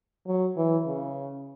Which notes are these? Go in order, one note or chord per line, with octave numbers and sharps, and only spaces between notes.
F#3
E3
C#3